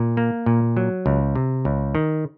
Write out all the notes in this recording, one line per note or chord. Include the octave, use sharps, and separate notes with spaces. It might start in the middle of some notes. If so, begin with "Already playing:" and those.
Already playing: A#2
A#3
A#2
F#3
C#2
C3
C#2
D#3